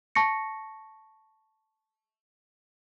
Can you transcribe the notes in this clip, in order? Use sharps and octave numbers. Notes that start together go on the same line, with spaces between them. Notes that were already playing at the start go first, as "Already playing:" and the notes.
A5 C#6 A#6 C#7